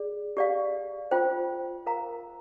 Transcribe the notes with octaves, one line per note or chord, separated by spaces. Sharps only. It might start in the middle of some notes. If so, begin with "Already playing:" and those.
Already playing: G#4 D5
G4 D5 F5
F4 C5 G5
A#4 F5 A#5